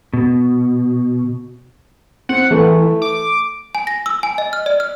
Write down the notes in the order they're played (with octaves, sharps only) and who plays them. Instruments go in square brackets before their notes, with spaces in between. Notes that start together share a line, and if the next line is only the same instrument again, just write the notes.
[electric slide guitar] B2
[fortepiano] C4 [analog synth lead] F#5
[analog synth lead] E3 [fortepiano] A3
[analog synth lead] D6
[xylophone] G#5
A#6
E6
G#5
D#5
F6
D5
F6